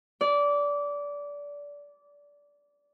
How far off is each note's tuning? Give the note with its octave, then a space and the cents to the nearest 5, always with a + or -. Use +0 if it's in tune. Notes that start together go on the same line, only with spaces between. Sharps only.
D5 -20